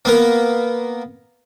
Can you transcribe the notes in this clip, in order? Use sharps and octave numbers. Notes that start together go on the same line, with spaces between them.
A#3 B3 A#4